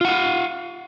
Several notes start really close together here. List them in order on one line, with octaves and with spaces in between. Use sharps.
F4 F#5 F5